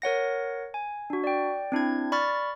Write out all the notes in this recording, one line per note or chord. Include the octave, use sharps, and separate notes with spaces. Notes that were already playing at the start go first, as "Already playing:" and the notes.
A#4 C#5 F#5 A#6
G#5
D4 F#4
D5 G5
C4 D4 E4 G#6
D5 B5 C#6 F6 A6